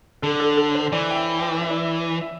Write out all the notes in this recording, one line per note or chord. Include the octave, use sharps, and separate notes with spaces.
D3 A4
A4
A4
C5
E3 D5
G5
E5
G5
E5
D5
E5
E5